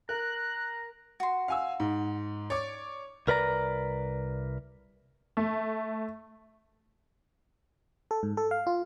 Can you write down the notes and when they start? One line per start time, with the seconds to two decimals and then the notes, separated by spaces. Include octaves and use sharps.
0.09 A#4 A#5 F#6
1.20 F#4 C6
1.48 F5 G#5 E6
1.80 G#2
2.50 C#5 D5 D6
3.27 C2 A#4 B4 D5 A#5
5.37 A3
8.11 A4
8.23 G#2
8.37 A4
8.51 F5
8.67 F4